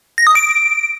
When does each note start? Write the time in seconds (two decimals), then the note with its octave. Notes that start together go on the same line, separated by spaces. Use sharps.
0.18 A#6
0.27 D#6
0.35 D7